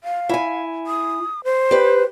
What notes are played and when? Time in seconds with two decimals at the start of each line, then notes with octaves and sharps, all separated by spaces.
0.04 F5
0.29 E4 G#5
0.87 D#6
1.44 C5
1.71 G4 B4